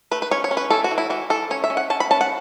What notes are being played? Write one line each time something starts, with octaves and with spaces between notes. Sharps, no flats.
A3 B4
B4
C#4 C#5
C#5
C#4
B4
E3 A4
F#4
E3
E4
E3 F#4
E3 A4
C#4 C#5
E5
C#4
F#5
C#4 A5
B5
C#4 A5
F#5